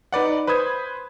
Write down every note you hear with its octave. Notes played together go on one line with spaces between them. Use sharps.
D#4 B4 D5 F#5
B4 C5 B5 D#6 G#6